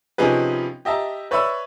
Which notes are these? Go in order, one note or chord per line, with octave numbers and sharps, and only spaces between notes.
C3 F3 C#4 D#4 G#4 B4
G4 D#5 E5 A5 A#5
B4 C#5 D5 E5 B5 E6